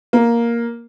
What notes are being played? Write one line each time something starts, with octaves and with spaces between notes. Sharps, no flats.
A#3